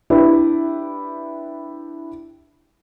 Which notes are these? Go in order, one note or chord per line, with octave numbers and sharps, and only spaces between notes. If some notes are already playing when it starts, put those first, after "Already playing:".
D4 E4 G4 B4 D5